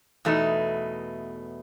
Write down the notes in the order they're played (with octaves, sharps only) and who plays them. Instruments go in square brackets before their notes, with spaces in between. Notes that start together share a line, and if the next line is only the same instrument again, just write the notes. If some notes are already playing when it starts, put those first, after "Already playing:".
[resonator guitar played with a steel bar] E2 B2 A3 D#4